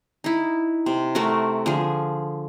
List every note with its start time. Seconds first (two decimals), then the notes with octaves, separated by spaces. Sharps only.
0.24 D#4 E4
0.86 C3
1.15 A3 F#4 A4 A#4
1.66 D3 F3 G#4